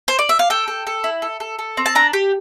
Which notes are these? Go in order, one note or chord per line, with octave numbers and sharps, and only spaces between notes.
C5
D5
E5
F5
A4 G5
A4
A4
E4
A4
A4
A4
C4
A5
D4 A#5
G4